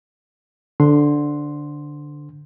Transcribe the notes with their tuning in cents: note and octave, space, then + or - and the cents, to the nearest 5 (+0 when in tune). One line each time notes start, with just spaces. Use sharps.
D3 +0 C5 -20 C6 +0